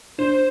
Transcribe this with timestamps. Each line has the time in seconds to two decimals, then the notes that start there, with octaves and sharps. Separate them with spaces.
0.18 D4 C5